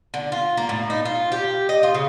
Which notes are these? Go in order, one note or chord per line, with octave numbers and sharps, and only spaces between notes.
D3
F4
A#3
A2
D#4
F4
G4
D#5
F4
C#3